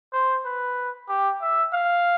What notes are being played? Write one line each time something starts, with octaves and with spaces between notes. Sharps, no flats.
C5
B4
G4
E5
F5